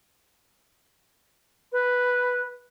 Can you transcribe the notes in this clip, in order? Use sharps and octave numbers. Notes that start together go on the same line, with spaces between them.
B4